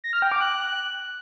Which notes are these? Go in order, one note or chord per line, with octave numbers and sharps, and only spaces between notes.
A#6
F6
G5
D6
F#6